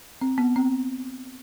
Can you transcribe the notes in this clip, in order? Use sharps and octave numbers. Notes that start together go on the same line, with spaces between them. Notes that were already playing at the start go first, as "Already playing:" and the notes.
C4
B3
C4